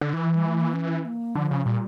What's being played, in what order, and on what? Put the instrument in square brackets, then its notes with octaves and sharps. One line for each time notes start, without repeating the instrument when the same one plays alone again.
[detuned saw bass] D3
E3
[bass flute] G3
A3
A#3
C#4
A#3
[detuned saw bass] D3 [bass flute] F3
[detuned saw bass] C#3
[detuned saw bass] A#2 [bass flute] G3